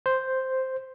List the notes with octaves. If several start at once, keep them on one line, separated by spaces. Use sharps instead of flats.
C5